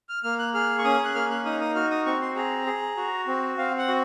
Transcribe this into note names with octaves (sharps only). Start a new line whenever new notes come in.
F6
A#3 F6
F#6
G#4 F6
C#6
C#4 D#6
F#6
A#3 F6
F#6
D#4 D#6
D#6
F#4 F6
D#6
C4 C#6
C6
G#4 A#5
G#4
F#4
C4
C4 F5
F#5
F#4